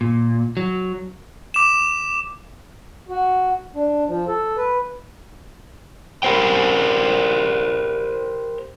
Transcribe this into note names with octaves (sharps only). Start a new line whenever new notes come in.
A#2
F#3
D6 E7
F#4
D4
F3
A4
B4
G4 A#4 C5 G5